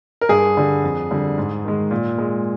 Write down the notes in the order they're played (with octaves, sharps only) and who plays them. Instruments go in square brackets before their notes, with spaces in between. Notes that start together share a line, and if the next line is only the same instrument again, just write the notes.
[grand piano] A#4
G2 G#4
D3 G3
F2
D3 G3
G#2
D#3 G#3
A#2
G#3